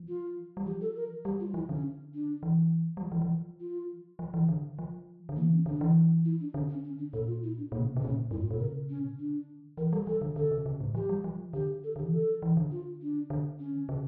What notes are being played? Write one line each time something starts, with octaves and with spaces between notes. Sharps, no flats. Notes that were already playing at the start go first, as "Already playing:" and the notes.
Already playing: F3
F4
G3
F3 G4
A4
A#4
G3 G4
F4
F3 E4
D3 C#4
D4
E3
G3
F3
E3
E3
F3
F4
F3
E3
D3
F3
D3
E3 A#3
C#4
D3 D4
E3
E4
D4
D3 C#4
C#4
C#4
D4
A#2 A4
F4
E4
D4
A#2 A#3
C#3
A#2
C#3
A#2 C#4
G2 E4
A2 F4
A#2 A4
C#3 A#4
C#4
A#2
C#3
D3 D4
E3 A#4
G3 A4
F3 A4
D3
D3 A4
C#3
C#3
A2
F3 G4
G3
F3
D3 G4
A4
D3 G4
E3
F3 A4
E3
D3
F4
D4
D3
C#4
C#3